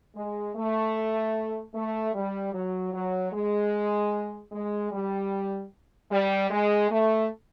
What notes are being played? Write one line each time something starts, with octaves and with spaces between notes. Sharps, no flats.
G#3
A3
A3
G3
F#3
F#3
G#3
G#3
G3
G3
G#3
A3